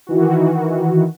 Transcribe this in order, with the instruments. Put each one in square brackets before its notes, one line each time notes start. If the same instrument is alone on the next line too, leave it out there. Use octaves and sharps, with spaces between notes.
[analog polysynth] D#3 E3 F#4